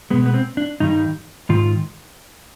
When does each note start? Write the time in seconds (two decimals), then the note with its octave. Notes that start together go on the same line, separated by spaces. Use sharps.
0.10 B2 G#3 B3
0.26 B3
0.34 C4
0.57 D4
0.80 G2 D#3 G3 D#4
1.49 G#2 D#3 F4